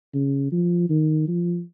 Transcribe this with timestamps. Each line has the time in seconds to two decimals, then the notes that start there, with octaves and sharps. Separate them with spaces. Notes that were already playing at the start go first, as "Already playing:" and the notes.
0.14 C#3
0.52 F3
0.89 D#3
1.28 F3